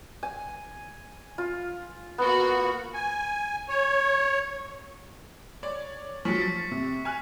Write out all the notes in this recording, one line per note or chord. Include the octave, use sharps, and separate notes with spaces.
G#5
F4
A#3 B3 F#4
G#5
C#5
C#5 D5
F3 F#3 C#6 B6 C#7
A6
C3
G#5 F6 F#6